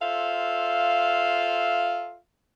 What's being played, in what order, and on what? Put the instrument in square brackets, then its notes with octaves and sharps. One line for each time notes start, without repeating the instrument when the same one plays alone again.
[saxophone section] F4 A4 C5 E5 F5